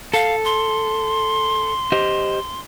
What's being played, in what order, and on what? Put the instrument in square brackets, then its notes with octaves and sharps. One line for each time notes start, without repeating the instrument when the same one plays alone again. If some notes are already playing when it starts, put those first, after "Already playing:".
[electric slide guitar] A4 [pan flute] F5
[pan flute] C6
[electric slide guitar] G4 C5 D#5